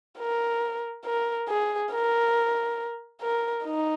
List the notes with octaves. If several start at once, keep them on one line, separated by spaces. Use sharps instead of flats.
A#4
A#4
G#4
A#4
A#4
D#4